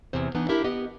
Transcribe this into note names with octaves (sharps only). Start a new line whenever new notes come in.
E2 C3 C5
E3 B3 D4 D#4
D4 E4 G4 A#4 E5
B3 G4 D#5